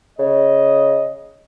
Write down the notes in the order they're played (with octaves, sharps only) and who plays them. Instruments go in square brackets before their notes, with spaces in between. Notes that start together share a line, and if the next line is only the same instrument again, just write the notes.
[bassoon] C#3 [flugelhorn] D#5